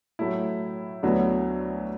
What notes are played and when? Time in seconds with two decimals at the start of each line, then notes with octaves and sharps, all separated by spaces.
0.19 A2 F#3 A3 E4
1.03 D2 D3 F#3 B3 E4